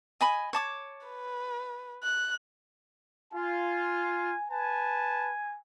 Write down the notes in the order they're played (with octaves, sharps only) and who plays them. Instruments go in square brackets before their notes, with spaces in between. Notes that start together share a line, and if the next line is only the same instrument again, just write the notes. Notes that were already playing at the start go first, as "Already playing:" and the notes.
[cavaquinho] D#5 G#5 B5
C#5 A5 D6
[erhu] B4
F#6
[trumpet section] F4 [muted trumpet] G#5
[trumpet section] B4 A5 [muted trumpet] G#5